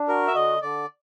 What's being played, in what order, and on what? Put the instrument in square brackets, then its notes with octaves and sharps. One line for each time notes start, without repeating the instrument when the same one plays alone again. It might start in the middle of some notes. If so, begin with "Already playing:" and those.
Already playing: [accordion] D4
[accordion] F#4 [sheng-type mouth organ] A#4
[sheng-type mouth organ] E5
[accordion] D3 [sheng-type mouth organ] D#5
[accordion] D3 [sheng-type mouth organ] D5